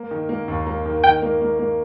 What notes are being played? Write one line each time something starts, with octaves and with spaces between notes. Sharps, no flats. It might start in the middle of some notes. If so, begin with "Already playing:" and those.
Already playing: A#3
D#3
A#3
D#2
A#3
D#3
D#3 G5
A#3
A#3
A#3